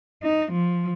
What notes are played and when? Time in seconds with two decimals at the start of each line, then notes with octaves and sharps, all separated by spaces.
0.22 D#4
0.51 F3